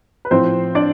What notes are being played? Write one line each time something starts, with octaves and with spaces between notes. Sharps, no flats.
B4
A2 F3 C4 C5
D4 D5